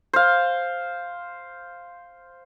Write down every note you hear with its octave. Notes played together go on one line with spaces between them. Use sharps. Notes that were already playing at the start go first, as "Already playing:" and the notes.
C5 F5